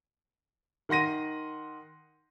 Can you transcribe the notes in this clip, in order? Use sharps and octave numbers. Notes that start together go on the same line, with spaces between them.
D#3 F#5 C6 A#6 D#7